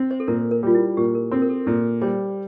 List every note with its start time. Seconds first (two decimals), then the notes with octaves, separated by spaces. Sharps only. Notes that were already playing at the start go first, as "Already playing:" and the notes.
Already playing: C4
0.11 C5
0.20 A4
0.28 A#2 A#4
0.51 A#4
0.63 G3 F4
0.75 E4
0.97 A#2 G4
1.15 A#4
1.31 C4 A4
1.42 A#4
1.49 A4
1.66 A#2 A4
2.01 G3 C5